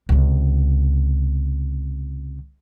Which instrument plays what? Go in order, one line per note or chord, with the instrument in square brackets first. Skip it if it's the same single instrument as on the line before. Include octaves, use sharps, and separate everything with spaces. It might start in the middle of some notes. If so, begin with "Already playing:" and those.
[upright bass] C#2 C3